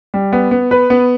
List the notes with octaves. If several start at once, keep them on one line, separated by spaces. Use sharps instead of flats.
G3
B3
B3
B4
B3